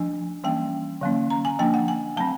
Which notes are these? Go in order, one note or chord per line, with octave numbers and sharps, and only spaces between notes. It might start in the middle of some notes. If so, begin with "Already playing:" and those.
Already playing: F3 A3 D4 G#5
E3 G3 A#3 C#4 G5
D3 F#3 A#3 C#4
A#5
G#5
F3 A#3 D4 G5
F#5
G#5
F#3 A3 C4 A5